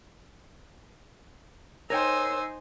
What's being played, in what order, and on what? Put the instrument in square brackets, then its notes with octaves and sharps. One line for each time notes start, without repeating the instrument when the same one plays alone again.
[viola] D#4 C5 [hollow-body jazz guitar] A#4 C#5 G5 [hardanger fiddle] G#5 [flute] E6